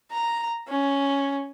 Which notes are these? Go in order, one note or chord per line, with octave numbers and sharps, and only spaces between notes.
A#5
C#4